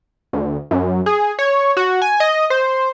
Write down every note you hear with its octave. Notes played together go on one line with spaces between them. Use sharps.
D2
F#2
G#4
C#5
F#4
G#5
D#5
C5